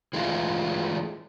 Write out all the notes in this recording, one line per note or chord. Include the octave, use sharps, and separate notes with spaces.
E3 G#3 A3 D#4 F4